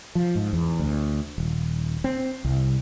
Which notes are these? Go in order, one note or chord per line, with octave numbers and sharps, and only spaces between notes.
F3
G#2
E2
D2
D#1
C4
C2